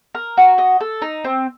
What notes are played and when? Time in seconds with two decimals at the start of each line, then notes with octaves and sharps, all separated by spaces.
0.15 A#4
0.37 F#4
0.58 D#5
0.81 A4
1.02 D#4
1.24 C4